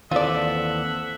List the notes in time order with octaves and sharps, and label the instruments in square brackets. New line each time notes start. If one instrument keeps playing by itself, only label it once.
[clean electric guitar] D#2 E3 C4 [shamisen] F4 D5 [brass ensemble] A4 [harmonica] E5 F#5